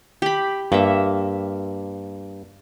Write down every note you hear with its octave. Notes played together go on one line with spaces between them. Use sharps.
G4 B5
G2 A#3 E5